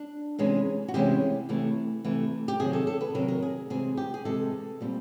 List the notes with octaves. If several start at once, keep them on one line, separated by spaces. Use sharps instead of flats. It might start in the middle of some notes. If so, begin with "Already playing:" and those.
Already playing: D4
C3 E3 G#3 C#4
F#4
C3 E3 G#3 C#4 G4
C3 E3 A3
C3 E3 A3
G4
C3 D#3 F#3 G#4
A4
A4
B4
C3 D#3 F#3 A#4
A#4
G#4
C3 E3 G#3 G#4
G4
G#4
C3 E3 G#3 A4
A#2 G3 C4